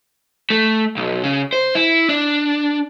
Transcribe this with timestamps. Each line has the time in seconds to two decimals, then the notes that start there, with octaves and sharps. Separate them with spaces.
0.50 A3
0.97 B1
1.24 C#3
1.53 C5
1.75 E4
2.09 D4